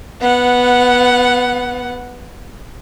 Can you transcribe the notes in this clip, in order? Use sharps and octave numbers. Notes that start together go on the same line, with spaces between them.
B3 F#5